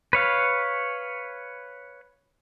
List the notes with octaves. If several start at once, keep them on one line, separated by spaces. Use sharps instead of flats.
B4 C#5 F5